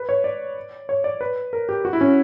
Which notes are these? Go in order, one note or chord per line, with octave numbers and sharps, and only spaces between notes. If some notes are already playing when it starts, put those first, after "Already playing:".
Already playing: B4
C#5
D5
C#5
D5
B4
A#4
G4
F#4
E4
C#4